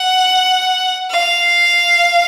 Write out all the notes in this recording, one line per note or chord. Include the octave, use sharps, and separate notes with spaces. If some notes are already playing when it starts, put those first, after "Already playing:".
Already playing: F#5
F5